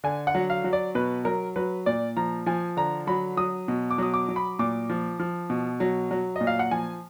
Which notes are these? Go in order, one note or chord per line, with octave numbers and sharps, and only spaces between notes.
D3 G#5
F#5
F#3
F5
F#3
D5
B2 B4
F#3 A#4
F#3 B4
A#2 D5
F3 A#5
F3 G#5
D3 A#5
F#3 B5
F#3 D#6
B2
D6
F#3 D#6
D6
F#3
B5
A#2 D6
F3
F3
B2
F#3
F#3
A#2 D#5
F5
F#5
F3 G#5